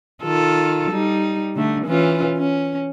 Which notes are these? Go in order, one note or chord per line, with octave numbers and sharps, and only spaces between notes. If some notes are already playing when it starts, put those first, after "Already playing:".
D#3 F4 A4
G3 D#4
D3 A3
E3 C#4 F4
C#4